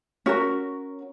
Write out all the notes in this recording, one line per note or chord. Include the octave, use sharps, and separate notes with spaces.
C#4 F#4 A#4